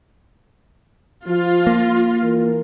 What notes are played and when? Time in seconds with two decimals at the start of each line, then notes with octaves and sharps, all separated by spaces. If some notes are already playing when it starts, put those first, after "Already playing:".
1.28 F3 F4
1.67 A#3
2.23 E3 A#4